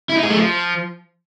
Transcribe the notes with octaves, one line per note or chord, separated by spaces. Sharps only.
E4
D#4
G#4
A3
F3